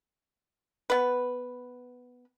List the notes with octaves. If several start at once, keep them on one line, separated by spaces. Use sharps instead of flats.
B3 B4